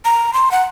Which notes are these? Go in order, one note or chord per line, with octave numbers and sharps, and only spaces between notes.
A#5
C6
F#5